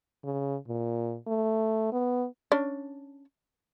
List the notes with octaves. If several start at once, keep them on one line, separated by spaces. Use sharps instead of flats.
C#3
A#2
A3
B3
C#4 D4